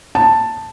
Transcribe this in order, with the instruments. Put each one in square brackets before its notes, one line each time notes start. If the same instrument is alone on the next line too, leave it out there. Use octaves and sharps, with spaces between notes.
[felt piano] A5